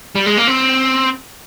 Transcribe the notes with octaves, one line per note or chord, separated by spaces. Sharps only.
G3
G#3
A#3
C4